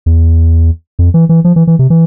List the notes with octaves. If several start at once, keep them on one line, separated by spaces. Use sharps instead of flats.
E2
F2
E3
E3
F3
E3
E3
C3
E3